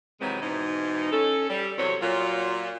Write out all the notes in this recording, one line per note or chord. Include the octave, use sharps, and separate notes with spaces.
C3 D#3 E3 F#3 G#3 C4
G#2 B2 E3 D#4
C#4 A4
G3
E2 C3 F#3 C4 C#5
A#2 F#3 F4